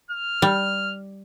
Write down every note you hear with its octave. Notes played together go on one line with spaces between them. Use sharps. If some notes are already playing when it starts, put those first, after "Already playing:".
F6
G3